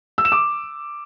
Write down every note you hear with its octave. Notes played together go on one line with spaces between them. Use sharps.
E6
E7
D6